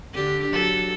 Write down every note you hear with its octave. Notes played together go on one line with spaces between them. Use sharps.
D3 D4 G4
F#3 A4